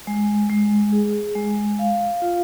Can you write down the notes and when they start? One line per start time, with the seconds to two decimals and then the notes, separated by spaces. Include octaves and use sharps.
0.07 G#3
0.50 G#3
0.92 G#4
1.36 G#3
1.79 F5
2.22 F4